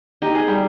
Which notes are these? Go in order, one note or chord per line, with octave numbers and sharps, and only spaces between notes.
D#4 G4
G#4
G3 G4